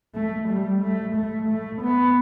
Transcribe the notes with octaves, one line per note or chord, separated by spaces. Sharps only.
A3
G3
A3
A3
A3
B3